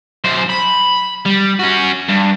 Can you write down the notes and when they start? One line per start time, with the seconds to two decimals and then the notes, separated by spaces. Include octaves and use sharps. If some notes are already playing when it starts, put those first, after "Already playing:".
0.24 F#2 C5
0.50 B5
1.26 G3
1.60 C#4 F#4
2.09 G2